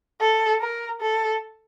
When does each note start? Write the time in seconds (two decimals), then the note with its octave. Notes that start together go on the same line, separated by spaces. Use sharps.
0.21 A4
0.61 A#4
1.01 A4